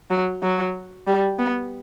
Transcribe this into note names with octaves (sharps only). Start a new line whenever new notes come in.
F#3
F#3
G3
B3